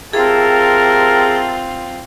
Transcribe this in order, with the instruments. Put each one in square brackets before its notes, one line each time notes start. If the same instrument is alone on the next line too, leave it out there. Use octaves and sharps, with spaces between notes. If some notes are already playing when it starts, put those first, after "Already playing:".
[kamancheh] C4 F4 [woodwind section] G4 E5 A5 [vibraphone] G#4 [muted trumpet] A#4